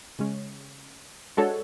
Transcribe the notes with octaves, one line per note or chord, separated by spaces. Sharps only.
C#3 G#3 C#4
G#3 D4 F#4 A4 C#5